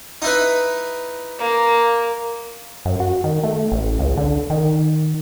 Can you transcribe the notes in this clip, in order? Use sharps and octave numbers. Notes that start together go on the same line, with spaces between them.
D#4 E4 B4
A#3
F#2
F#4
D#3
A3
A1
C#2
D3
D#3